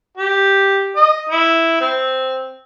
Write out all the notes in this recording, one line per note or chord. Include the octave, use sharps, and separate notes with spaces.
G4
D#5
E4
C4